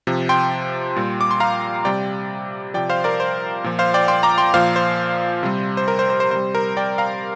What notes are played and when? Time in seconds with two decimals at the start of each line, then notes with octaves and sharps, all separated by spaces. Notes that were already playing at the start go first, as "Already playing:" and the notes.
0.07 C3 F3
0.29 G5 C6
0.96 A#2 G3
1.21 D6
1.31 C6
1.40 F5 A#5
1.85 C3 G3 D5 G5
2.74 C3 F3 D5 G5
2.89 C5 F5
3.04 A#4 D5
3.20 C5
3.64 A#2 F3
3.79 C5 F5
3.94 D5 G5
4.08 G5 C6
4.23 A#5 D6
4.38 G5 C6
4.54 A#2 F3 C5 F5
4.76 C5
5.43 C3 G3
5.77 C5
5.88 A#4
5.99 C5
6.10 C5
6.20 C5
6.31 C3 G3 C5
6.55 A#4
6.77 D5 G5
6.98 F5 A#5